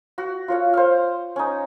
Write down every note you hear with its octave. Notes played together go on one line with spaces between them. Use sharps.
F#4
F4 C#5 F5
C5 F5
C#4 D#4